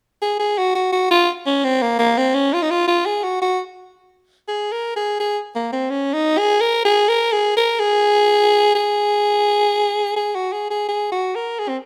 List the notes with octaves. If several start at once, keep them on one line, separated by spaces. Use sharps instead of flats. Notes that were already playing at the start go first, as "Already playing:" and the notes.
G#4
G#4
F#4
F#4
F#4
F4
C#4
C4
A#3
A#3
C4
C#4
F4
D#4
F4
F4
G#4
F#4
F#4
G#4
A#4
G#4
G#4
A#3
C4
C#4
D#4
G#4
A#4
G#4
A#4
G#4
A#4
G#4
G#4
G#4
F#4
G#4
G#4
G#4
F#4
A#4
G#4
C4